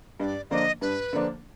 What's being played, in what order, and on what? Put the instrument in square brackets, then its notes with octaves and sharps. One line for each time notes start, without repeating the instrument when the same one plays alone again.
[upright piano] G2 [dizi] D#5
[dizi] D5
[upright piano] D3 F3 A#3 D4 [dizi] D#5
[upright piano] G2 [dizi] B4
[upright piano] D3 F3 A#3 D4